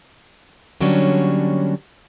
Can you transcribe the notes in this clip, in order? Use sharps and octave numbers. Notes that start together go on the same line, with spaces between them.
D3 F#3 G3 A#3 C#4 D4